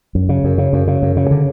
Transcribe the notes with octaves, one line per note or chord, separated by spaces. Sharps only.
F#2
C#3
F#2
C#3
F#2
C#3
F#2
C#3
D3